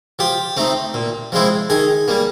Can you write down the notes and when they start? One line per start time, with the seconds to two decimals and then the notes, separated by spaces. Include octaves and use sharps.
0.19 F3 G4
0.57 A3 C4 D#4
0.94 A#2
1.32 F3 G#3 C4 E4
1.70 D#3 G#4
2.08 G3 A#3